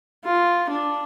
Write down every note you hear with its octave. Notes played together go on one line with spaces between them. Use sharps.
F4
D4